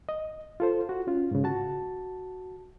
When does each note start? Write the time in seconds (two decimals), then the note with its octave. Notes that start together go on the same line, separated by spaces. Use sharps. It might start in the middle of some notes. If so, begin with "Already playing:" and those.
0.09 D#5
0.60 F4 A4 C5
0.89 F#4
1.07 C#4 F4
1.31 G#2 C#3
1.44 F#4 A5